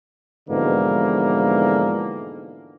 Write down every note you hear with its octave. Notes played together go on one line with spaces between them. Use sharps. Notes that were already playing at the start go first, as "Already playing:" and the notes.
G#2 B2 D3 E3 F3 A#3